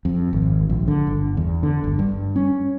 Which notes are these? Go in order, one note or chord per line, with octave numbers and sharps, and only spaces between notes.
F2
G#1
A#1
D3
G1
E2
D3
G1
G2
C#4